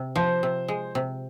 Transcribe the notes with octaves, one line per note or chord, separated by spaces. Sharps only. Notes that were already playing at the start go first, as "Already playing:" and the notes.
Already playing: C3
F3 C5
C3
G#3
C3